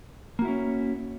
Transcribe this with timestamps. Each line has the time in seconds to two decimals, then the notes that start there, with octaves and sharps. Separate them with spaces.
0.39 A#3
0.42 F#4
0.45 E4
0.48 C#4